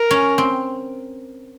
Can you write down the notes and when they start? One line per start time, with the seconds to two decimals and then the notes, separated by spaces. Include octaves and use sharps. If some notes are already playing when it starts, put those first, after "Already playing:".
Already playing: A#4
0.11 C#4
0.38 C4